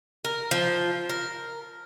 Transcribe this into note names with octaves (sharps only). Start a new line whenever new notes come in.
A#4
F3
A#4